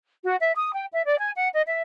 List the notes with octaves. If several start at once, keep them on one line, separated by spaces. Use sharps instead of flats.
F#4
E5
D#6
G5
E5
D5
G#5
F#5
D#5
E5